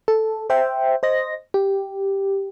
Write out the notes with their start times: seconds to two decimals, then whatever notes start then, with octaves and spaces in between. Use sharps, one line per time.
0.08 A4
0.50 C5 E5 G5
1.03 C5 D#5 A#6
1.54 G4